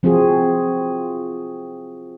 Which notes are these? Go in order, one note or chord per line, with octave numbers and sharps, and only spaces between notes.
F3 C4 F4 F#4 G#4